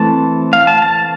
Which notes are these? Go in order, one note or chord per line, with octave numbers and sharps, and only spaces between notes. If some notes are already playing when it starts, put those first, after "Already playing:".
Already playing: E3 A3 C4 A5
F5
A5
A5